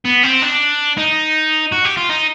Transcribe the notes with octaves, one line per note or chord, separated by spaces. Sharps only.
B3
C4
D4
D#4
F#4
G4
F4
D#4